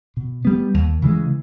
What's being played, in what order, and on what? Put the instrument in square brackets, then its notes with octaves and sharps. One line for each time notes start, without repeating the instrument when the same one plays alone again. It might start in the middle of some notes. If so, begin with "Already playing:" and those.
[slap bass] B2
G3 B3
D#2
C#3 E3 G#3